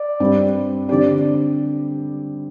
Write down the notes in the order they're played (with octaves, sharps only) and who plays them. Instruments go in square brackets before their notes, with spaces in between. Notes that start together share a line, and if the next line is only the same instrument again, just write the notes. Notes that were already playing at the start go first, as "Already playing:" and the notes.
Already playing: [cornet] D5
[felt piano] G2 G3 C4
[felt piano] D3 C4 G4 [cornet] D5